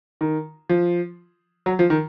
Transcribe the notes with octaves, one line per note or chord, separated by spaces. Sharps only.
D#3
F3
F#3
F3
D#3